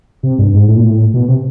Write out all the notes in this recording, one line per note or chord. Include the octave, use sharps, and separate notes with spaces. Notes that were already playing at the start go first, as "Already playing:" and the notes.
C3
G2
G#2
A2
A#2
A2
B2
C3